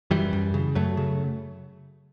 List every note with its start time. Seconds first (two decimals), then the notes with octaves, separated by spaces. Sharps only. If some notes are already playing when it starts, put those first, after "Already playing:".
0.11 F#2 E3 G3
0.33 F#2
0.54 C#3
0.75 F#2 F#3 A3
0.97 C#3